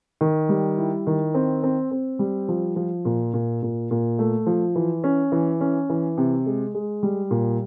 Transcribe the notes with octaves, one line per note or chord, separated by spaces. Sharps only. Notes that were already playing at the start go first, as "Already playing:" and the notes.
D#3
G3
E4
D#3
C4
C4
C4
G3
F3
F3
A#2
A#2
A#2
A#2
A3
F3
E3
C#4
E3
C#4
E3
C3
G#3
G#3
G3
A#2